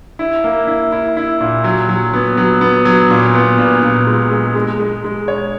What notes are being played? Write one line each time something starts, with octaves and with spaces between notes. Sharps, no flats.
E4
A#3
E4
E4
E4
A#2
F#3
F#3
B3
F#3
B3
F#3
A#2
B3
A#2
A#2
G#3
G#3
G#3
G#3
G#3
C#5